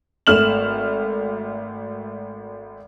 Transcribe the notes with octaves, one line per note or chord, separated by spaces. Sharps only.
G#1 A3 F6 E7 F#7